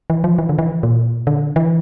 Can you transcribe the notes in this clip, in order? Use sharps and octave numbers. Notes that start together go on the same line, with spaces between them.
E3
F3
E3
D3
E3
A#2
D3
E3